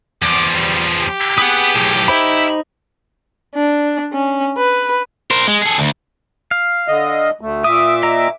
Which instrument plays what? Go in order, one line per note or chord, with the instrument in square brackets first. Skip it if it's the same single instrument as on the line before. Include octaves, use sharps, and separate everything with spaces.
[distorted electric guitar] E2 F3 [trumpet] D6
[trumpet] G3
G4
[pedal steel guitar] G#4 D#6 [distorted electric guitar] B4 F#5
[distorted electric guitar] B1 A2
[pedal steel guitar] D#4 C5 B5 [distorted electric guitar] E4 E5
[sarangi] D4
C#4
B4
[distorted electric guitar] A#4 C5
G#3
G#4 A4
D2
[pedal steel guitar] F5
[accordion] D3 D#5
D2 A3
[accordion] A#2 E5 D6 [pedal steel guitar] D#6
[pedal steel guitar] D#5 A#5